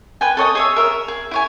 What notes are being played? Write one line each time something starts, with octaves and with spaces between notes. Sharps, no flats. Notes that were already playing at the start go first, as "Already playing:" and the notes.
B4 G5 G#5
A4 C#5 D#5 D#6
G#4 C#5 E5
A#4 E5
G#4
E4 C#5 G#5